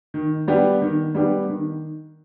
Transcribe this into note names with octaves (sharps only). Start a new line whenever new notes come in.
D#3
G3 B3 D4 G4
D#3
G3 B3 D4 G4
D#3